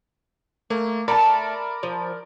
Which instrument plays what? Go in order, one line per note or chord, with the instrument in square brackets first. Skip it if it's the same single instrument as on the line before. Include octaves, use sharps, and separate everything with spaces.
[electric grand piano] A3 [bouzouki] A#3
[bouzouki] A3 G5 A5 [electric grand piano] A#4 D5 B5
[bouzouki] F3